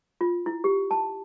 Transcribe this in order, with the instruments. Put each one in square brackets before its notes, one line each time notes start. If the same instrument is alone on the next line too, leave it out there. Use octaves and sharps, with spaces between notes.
[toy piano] F4
E4
G4
A5